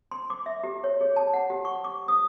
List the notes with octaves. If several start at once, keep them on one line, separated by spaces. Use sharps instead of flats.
C6
D6
E5
G4
C#5
G#4
A5
F#5
G4
C#6
D6
D#6